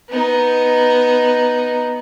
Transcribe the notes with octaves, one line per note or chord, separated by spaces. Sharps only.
B3 D#4